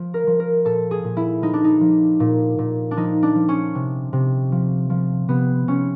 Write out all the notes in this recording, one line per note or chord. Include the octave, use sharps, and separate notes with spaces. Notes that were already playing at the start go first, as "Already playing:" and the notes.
Already playing: F3
A#4
F3
A#4
A#2 A4
G#4
A#2
E4
F3 D#4
D4
D#4
F3
A#2
A#2
D4
F3 D#4
D4
F3
C#4
C3
C3
F3
F3
C3 B3
C3 C#4